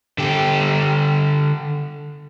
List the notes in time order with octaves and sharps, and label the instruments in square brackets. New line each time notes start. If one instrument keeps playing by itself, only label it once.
[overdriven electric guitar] D3 G4